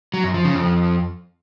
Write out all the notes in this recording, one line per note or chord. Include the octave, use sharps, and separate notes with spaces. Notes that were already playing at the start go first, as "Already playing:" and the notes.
F#3
F#2
F3
C#3
F2